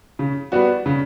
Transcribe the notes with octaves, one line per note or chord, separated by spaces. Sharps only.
C#3
G3 B3 F#4
C#3